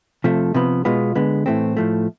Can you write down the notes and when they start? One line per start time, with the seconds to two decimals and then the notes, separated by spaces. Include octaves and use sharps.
0.24 C3 F3 A3
0.54 C3 F3 B3
0.85 B2 G#3 B3 F4
1.15 D3 G#3 B3
1.46 A2 E3 A3 C4
1.77 A2 F3 A3